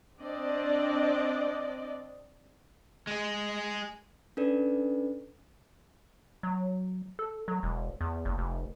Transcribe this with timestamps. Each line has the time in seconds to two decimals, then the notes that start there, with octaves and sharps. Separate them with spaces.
0.19 C4 D4 D5 D#5
3.07 G#3 G#4
4.37 C#4 D4 A4 B4 D5
6.43 F#3
7.19 A4
7.48 F#3
7.63 E1
8.01 E2
8.25 F#1
8.38 F1